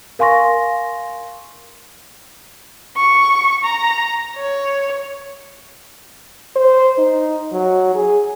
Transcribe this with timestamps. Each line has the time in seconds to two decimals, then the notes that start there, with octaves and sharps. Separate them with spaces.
0.19 A#4 F5 G#5 C6 C#6 A#6
2.97 C#6
3.64 A#5
4.37 C#5
6.56 C5
6.98 D#4
7.53 F#3
7.95 G#4